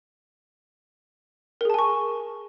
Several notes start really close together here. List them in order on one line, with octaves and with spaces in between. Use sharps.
A#4 G#4 A5 G#5 C#6